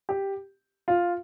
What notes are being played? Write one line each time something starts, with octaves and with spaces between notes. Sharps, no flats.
G4
F4